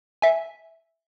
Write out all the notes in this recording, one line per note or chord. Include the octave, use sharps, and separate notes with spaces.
E5 G#5